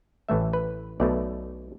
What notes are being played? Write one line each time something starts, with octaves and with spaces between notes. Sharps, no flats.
A1 A2 E3 A3 E5
B4
B1 B2 A3 D5